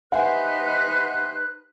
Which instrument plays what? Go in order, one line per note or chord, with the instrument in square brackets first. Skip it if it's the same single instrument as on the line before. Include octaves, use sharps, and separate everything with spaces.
[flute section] D#4 B4 F#6 [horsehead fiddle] G4 C5 [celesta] E5 G#5 [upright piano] F#5